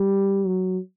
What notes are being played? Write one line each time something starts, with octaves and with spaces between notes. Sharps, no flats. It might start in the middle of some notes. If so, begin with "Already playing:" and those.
Already playing: G3
F#3